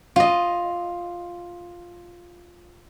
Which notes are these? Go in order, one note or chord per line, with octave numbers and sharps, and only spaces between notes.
F4 D#5